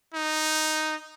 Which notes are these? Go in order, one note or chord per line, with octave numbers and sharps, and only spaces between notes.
D#4